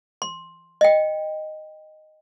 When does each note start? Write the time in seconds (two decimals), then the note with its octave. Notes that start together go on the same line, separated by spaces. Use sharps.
0.22 C6
0.81 D#5 G5